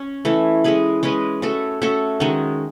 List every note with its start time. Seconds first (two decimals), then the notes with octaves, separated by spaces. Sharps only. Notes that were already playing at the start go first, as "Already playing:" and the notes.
Already playing: C#4
0.25 E3 A3 C#4
0.64 G#3 C#4 G#4 B4
1.03 G#3 C#4 G#4 B4
1.42 A3 C#4 F#4 A4
1.82 A3 C#4 F#4 A4
2.20 D#3 G#3 C#4 F#4